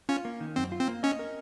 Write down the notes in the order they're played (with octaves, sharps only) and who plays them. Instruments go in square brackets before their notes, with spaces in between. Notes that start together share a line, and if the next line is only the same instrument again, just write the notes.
[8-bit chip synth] C#4 [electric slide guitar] F4
[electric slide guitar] A#3
D#3
[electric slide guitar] F#2 [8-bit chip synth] C4
[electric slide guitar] F4
[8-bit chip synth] C4
[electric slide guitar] A#3
[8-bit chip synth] C#4 [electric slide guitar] D#5
[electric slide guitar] A#4